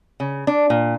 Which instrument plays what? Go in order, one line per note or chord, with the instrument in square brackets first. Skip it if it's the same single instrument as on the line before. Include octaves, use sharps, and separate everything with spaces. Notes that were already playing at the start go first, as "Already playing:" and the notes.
[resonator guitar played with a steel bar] C#3
D4
A#2